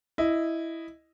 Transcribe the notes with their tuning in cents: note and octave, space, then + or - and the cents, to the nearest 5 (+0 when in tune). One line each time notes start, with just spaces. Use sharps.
E4 +0 D#5 +0